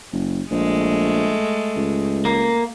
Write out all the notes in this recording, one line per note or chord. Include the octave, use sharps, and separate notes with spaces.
F#1
A#1 G#3 A3
C#2
A#3